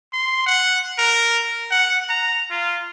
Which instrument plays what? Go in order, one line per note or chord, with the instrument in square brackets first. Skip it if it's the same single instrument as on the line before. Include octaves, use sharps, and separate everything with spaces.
[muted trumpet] C6
F#5
A#4
F#5
A#5
F4